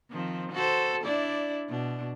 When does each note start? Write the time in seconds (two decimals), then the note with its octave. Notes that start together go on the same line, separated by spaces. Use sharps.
0.10 D#3 F3 C4
0.52 F#4 A4 C5
1.03 D4 E4 D5
1.69 B2 D4